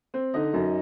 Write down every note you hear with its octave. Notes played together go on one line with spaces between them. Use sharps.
C4
D3 D#4 D#5
F#2